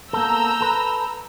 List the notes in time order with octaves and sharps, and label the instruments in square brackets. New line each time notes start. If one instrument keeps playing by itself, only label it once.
[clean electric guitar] A#3 B3 A4 [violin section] A#5 E6 G6
[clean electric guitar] A4 B4